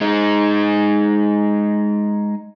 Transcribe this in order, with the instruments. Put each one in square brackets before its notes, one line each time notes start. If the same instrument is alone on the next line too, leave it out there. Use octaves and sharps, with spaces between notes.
[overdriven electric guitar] G#3 D#4